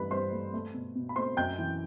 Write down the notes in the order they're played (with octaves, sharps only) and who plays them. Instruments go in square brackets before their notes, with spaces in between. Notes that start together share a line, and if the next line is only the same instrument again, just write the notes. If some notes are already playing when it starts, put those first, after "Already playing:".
Already playing: [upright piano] G2 E3 A3 B4 B5
G2 C5 C6
A3
A3
B2
B2
B5
A3 C5 C6
F#2 G5 G6
E3